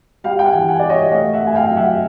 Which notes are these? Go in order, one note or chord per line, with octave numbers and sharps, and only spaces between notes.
G3 F5 G5
G5
F#5 G#5
E3
F#5 G#5
G3 D5
C#5 D#5
A3 D#5 F5
E5 F#5
A3
G#5
F5 G5
F#3
E5 F#5